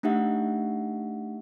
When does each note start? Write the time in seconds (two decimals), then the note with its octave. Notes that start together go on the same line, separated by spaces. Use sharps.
0.03 A3 D4 D#4 G4 E5 F#5